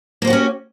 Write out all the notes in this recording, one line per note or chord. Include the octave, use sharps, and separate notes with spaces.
A#3 C#4 F#4 G4 C5